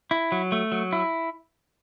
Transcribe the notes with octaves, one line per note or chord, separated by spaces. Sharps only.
E4
F#3
A3
F#3
E4